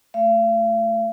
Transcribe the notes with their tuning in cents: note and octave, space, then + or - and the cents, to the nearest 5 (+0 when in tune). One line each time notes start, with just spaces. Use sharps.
A3 +0 F5 -45